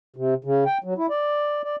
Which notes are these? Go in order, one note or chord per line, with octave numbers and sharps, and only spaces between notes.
C3
C#3
G5
F#3
E4
D5
D5